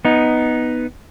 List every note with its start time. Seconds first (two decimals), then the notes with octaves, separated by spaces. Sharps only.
0.05 B3 D#4